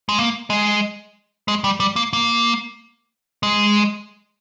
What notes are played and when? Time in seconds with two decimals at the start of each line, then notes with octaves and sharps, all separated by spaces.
0.09 G#3
0.18 A#3
0.50 G#3
1.48 G#3
1.64 G3
1.80 G3
1.96 A#3
2.13 A#3
3.43 G#3